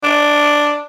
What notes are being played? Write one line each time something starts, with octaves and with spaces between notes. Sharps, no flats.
D4